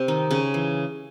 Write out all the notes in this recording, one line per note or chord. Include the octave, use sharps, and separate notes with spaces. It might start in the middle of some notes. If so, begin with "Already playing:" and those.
Already playing: C3 C4
D#3 D#4
C#3 C#4
E3